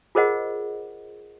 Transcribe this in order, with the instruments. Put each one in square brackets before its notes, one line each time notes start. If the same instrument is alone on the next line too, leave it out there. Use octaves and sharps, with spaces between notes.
[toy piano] F4 G#4 A#4 C5 D#5 F#5